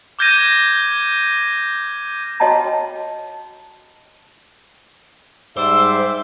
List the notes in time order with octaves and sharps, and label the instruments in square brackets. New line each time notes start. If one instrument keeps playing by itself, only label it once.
[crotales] D6 F6 G6 G#6 A#6 D#7
[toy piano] F#4 C#5 D#5 G5 A5 A#5
[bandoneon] G#2 G3 D6 [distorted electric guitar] C5 [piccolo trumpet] E5 [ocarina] E6